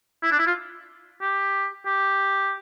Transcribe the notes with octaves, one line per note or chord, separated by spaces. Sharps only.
E4
D4
E4
F4
G4
G4